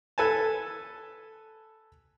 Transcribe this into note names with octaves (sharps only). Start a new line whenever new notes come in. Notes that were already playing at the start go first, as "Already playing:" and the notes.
A4 B4 G#5 A5